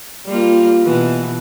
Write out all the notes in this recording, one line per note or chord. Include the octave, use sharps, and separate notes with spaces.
G3 A#3 F4
B2 E3